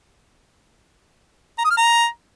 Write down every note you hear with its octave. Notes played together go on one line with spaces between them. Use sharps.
A#5
D#6
F6
A#5